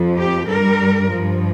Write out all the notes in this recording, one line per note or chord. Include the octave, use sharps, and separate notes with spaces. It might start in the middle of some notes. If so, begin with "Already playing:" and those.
Already playing: F2 F3
G4
G2 G3 A#4
G2 F3